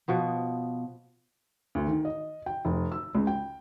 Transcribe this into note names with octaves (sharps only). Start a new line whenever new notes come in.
B2 F3 B3
D2
D#3
D#5
G5
F1
E6
C#2
G5